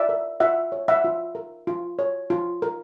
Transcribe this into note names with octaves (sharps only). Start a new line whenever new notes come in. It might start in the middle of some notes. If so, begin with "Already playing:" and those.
Already playing: F4 D5 E5
A#4
F4 E5 F#5
C#5
E5 F#5
F4
A#4
F4
C#5
F4
A#4